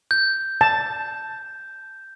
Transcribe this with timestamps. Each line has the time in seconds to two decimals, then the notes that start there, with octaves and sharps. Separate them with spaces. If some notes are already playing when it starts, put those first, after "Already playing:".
0.11 G6
0.61 A5